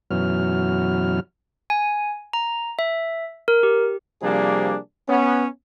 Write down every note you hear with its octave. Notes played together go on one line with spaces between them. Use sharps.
F#2 B2 E3 F#3 F6
G#5
A#5
E5
A#4
G4
C3 F3 G3 A#3 D4 G#4
B3 C#4